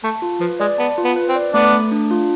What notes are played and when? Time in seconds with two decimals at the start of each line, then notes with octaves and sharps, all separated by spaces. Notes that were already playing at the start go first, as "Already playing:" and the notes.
0.04 A3 A5
0.22 F4
0.40 F3 B4
0.60 G#3 D5
0.78 B3 A5
0.98 F4
1.04 B3
1.16 B4
1.29 C4
1.35 D5
1.53 A3 B3 D4
1.72 A3
1.92 D4
2.11 F4